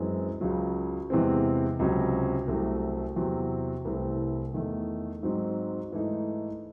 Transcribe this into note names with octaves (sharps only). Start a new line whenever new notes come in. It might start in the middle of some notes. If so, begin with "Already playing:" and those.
Already playing: F#2 E3 G#3 C4
C#2 C#3 F#3
E2 C3 E3 G#3 C4
C#2 C3 F#3 C#4
C2 C3 F#3 A3
E2 C3 F#3 C4
C2 C3 E3 A3 C4
E2 D#3 A3
G#2 F#3 C4 D#4
G#2 E3 A3 D#4